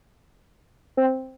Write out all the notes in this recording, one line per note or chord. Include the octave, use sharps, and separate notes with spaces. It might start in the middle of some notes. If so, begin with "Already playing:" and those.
C4